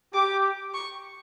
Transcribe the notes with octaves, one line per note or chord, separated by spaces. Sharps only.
G4 D6
C#6